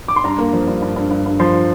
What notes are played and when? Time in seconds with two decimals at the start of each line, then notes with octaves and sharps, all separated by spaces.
0.08 D6
0.16 C6
0.24 G2 A#5
0.38 A#3
0.53 F3
0.67 G2
0.82 G2
0.96 G2
1.11 G2
1.26 G2
1.40 F3 C6